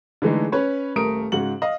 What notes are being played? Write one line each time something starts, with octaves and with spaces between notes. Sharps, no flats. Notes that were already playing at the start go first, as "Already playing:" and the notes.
D3 E3 G#3 A3 D#4
C#4 B4 C#5
D#1 A3 A#4 D#6 D7
G#2 C#3 F#4 F#5 F#7
D#5 F5